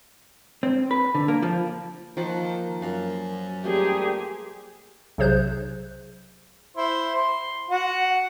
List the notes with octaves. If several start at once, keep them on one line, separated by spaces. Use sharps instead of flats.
C4
B4
D3
A#3
F3
D#3 F3 A#3 F#5 A5
F#2 F5
G3 A3 A#3 G4 G#4 C5
B1 C3 G#4 C5 F#6 G6
E4 C5
C6
F#4 F#5